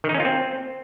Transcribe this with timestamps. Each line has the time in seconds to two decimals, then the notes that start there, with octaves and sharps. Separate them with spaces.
0.04 D#3
0.09 D#4
0.14 C#4
0.20 F4
0.25 C4